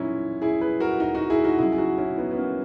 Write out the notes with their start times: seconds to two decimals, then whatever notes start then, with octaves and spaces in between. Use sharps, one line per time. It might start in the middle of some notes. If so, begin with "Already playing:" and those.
Already playing: A#2 F#3 C#4 D#4 E4
0.42 E4 G#4
0.61 G#4 B4
0.80 F#4 A#4
1.00 D#4 F#4
1.15 D#4 F#4
1.30 E4 G#4
1.44 D#4 F#4
1.59 C#3 F#3 E4 G#4
1.72 G#4
1.78 D#4 F#4
1.98 C#4 E4
2.17 B3 D#4
2.31 B3
2.37 A#3 C#4